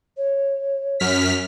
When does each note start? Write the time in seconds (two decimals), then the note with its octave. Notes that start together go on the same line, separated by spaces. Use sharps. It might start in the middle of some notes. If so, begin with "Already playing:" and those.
0.17 C#5
1.00 F#2 F6 B6